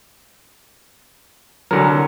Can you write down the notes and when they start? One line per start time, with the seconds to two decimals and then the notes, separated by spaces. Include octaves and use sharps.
1.71 C2 D3 F#3 A#4